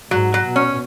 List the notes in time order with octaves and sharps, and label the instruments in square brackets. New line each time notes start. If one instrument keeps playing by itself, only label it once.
[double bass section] G#2 [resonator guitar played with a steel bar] F#3
[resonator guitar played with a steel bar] F#3
[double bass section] B2
[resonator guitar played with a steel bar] C#4